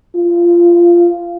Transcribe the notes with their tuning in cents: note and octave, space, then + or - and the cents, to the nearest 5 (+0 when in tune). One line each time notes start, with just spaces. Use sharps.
F4 -15